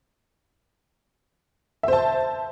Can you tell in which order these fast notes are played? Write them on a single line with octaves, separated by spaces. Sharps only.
E5 C5 A5